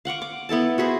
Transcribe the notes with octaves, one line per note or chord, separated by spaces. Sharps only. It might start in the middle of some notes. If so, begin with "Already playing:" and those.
F5 F#5 C#6 D6
D6
B3 E4 A4 A5
F#4 G#4 B4 C5